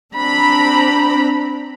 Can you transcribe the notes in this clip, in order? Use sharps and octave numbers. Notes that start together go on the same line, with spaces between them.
C4 D4 A#5 B5